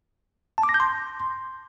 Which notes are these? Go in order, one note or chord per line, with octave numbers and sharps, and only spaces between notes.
A5
D6
A#6
G6
C6